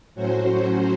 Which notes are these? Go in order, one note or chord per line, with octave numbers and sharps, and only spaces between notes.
A2 F#3 C#4 F#4 C5